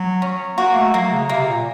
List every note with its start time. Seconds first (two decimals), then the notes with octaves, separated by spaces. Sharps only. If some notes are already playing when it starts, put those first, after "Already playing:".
Already playing: F#3
0.22 C#4
0.57 A#3 F#4
0.76 A3
0.94 F#3 A#3
1.12 C#3
1.29 C3 A#3
1.48 A#2